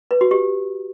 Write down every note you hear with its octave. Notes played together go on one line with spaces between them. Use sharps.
B4
F#4
G4